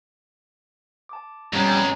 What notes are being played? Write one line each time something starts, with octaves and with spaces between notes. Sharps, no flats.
A5 D6
F2 G3 G#3 B3 C#4 A#5 C#6